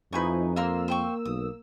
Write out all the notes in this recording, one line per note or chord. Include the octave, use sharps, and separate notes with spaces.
F2 F3 D#4 E4 B4 G#5 C#6
A#3 F4 A#4 C6 E6
C5 G5 C#6
B1 D#6